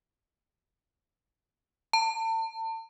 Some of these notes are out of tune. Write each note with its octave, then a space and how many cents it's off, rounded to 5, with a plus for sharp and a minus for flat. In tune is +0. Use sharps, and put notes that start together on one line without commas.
A5 +35